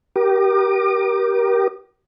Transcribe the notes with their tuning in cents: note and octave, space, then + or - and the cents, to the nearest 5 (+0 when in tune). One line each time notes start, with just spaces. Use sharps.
G4 -20 A#4 +25 D6 +40